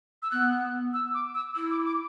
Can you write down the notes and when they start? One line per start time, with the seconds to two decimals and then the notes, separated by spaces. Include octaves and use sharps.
0.22 E6
0.31 B3 F#6
0.94 E6
1.14 D6
1.34 E6
1.55 E4 E6
1.71 D6
1.86 D6